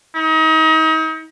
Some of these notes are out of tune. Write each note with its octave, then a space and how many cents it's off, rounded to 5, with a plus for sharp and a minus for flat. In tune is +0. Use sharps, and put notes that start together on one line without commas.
D#4 +35